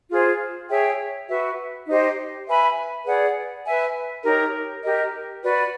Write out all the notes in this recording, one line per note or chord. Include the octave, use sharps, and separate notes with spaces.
F4 G#4 C5 F5
G#4 C#5 E5 G5
F#4 B4 E5
D#4 G4 C5 D#5
B4 E5 G#5 B5
G#4 B4 D5 F#5
B4 E5 G#5
D#4 G4 A#4 C#5
G4 A#4 D#5
F#4 B4 D5